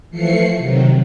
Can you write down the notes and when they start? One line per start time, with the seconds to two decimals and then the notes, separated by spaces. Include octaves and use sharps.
0.11 E3 F3 A3 C7 C#7
0.57 C3 D#3 F#3